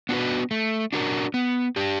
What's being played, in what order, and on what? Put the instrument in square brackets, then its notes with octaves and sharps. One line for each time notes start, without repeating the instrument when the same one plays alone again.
[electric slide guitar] B3 D4 F#4 B4
A3
D4 F#4 A#4
B3
D4 G4